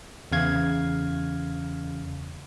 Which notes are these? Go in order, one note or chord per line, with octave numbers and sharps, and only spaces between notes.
E2 C#3 F5 G#6